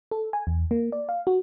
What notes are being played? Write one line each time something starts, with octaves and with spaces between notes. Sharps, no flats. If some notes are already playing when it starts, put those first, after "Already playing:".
A4
G#5
E2
A#3
D5
F5
F#4